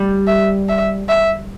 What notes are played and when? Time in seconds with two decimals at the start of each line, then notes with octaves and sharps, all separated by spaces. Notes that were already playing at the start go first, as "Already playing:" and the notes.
Already playing: G3
0.27 E5
0.69 E5
1.09 E5